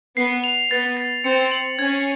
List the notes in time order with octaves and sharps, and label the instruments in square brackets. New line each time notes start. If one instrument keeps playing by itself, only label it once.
[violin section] B3 [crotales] C7
[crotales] F7
[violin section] B3 [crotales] A6
[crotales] A6
[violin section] C4 [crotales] C#7
[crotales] F#7
[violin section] C#4 [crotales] G#6